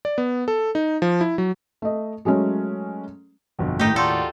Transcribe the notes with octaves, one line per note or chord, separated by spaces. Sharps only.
D5
B3
A4
D#4
F3
E4
F#3
A3 D#5
F#3 G#3 A3 C#4
G1 F2 B2
D#2 A2 A3 D#4 G4
F4 F#4 A4 D5 C6